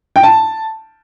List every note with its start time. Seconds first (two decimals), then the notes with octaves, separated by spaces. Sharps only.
0.16 G5
0.23 A5